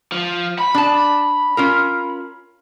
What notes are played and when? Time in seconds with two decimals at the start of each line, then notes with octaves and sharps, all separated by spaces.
0.12 F3
0.59 B5
0.75 D4 A5
1.57 C#4 F4 A#4